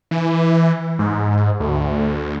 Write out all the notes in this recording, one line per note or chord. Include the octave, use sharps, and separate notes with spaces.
E3
G#2
D2